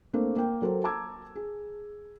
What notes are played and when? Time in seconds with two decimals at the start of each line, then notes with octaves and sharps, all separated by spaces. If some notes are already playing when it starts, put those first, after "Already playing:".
0.13 A3 A#3 C4 D4 C5
0.36 A#3 G5
0.62 F#3 A4 A#4 C5
0.84 A5 A#5 D6 E6 G#6
1.36 G#4